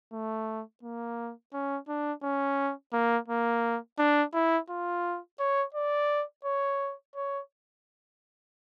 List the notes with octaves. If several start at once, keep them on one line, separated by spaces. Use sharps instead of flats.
A3
A#3
C#4
D4
C#4
A#3
A#3
D4
E4
F4
C#5
D5
C#5
C#5